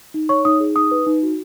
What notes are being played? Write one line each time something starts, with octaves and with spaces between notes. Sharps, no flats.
D#4
C#5 C#6
D#4 D#6
G#4
D#4 D#6
B4
D#4
F#4